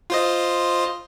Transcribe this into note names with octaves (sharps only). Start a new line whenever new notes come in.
F4 C5 D#5